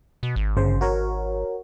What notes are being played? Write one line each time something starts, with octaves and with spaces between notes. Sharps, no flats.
B2
G#1
G1 C#3 C5
F#4 A#4 C#5